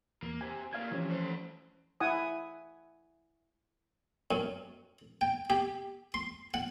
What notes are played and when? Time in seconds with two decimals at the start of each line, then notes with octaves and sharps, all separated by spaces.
0.22 E2 A#3
0.41 C3 G#5
0.73 A2 A#3 F5 G#6
0.91 C3 E3 F3 C#4
1.08 A3 C5
2.00 E4 F#5 G#5 D#6
4.31 F#2
5.21 G5
5.50 G4
6.14 C6
6.54 F#5